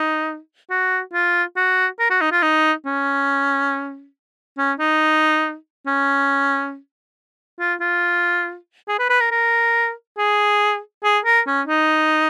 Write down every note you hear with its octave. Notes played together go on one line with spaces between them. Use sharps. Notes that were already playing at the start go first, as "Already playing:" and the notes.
Already playing: D#4
F#4
F4
F#4
A#4
F#4
D#4
F4
D#4
C#4
C#4
D#4
C#4
F4
F4
G#4
B4
B4
A#4
A#4
G#4
G#4
A#4
C#4
D#4